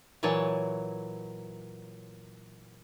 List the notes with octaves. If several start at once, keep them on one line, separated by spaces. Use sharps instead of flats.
A#2 E3 F#3 C#5 A5